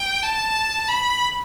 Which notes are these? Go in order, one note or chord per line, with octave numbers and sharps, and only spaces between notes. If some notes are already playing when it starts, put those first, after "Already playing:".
Already playing: G5
A5
B5